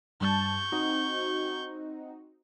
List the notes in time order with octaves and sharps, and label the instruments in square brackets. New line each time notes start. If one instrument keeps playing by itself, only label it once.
[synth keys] G2 G3 A5 [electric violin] C#6 G6
[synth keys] C4 D#4 F#4